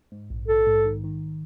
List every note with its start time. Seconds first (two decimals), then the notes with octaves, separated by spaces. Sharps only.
0.12 G#2
0.30 A#1
0.48 A#1 A4
0.67 G#2
0.85 D#3
1.04 D#3